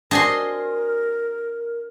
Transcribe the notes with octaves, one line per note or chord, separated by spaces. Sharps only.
D4 F#4 A#4 C5 D#5 G#5 C6